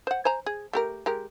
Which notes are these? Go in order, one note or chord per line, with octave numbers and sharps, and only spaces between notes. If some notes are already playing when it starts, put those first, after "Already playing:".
C5 F#5
C5 G#5 A#5
G#4
A3 G4 A#4
G#3 G4 A#4